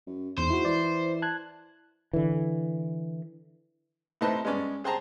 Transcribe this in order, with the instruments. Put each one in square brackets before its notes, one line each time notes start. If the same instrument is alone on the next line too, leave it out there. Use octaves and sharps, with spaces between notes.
[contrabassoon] F#2
[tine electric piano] E2 [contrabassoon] G#2 [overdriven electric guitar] C5
[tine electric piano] E4 F#4
[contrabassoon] E3 [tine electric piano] D5
[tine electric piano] A5 F#6 G#6
[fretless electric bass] D3 E3
[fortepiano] A2 C3 D#4 B4 C5 A5
G#3 B3 C#4 D5
G#4 C5 G5 A5 A#5